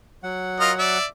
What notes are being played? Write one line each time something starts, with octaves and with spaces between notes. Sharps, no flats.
F#3 F#5
F4 A#4 D#5
D5 E5